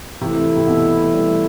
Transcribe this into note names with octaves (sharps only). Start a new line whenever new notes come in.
C3 E3 A3 E4
C3
B2
G3